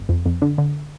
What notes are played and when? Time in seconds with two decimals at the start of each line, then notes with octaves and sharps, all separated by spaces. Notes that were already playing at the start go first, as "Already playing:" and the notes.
Already playing: G1
0.09 F2
0.26 F2
0.42 D3
0.58 D3